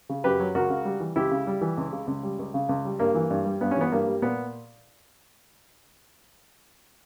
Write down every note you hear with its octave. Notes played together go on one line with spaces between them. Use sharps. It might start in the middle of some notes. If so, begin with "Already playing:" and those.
C#3
F#2 G4 B4
F#3
C#2 F#4 A#4
C#3
G3
E3
C#2 E4 G4
C#3
G3
E3
C#2
C#3
C#2
G3
C#2
C#3
C#2
G3
G2 A#3
E3
G2
G3
G2 B3
C#4
E3 B3
G2 A#3
G3
A#2 B3